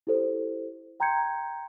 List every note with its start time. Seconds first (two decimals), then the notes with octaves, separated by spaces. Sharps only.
0.07 E4 G4 A4 C5
1.00 G5 A#5 C6 G6 G#6 C#7